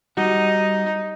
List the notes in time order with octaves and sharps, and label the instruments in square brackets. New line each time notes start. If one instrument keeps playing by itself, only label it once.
[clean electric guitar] G3 F#4 F#5 [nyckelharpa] D#4